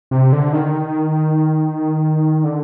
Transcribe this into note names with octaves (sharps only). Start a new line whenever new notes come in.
C3
D3
D#3
D3